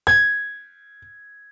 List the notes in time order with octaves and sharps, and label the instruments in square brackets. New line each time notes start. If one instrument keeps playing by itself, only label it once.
[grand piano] G#6